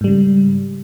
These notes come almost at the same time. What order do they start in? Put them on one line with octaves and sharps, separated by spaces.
G#2 G3 C#3